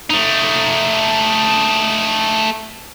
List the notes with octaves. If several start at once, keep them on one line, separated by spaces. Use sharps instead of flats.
A3 D#4